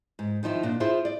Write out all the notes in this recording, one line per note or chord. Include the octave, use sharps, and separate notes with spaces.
G#2
D#3 F3 D#4 E4
A#2 D4
E4 F4 G#4 C5
D5